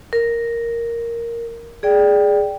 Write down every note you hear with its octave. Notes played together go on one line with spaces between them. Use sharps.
A#4
G#4 D5 G5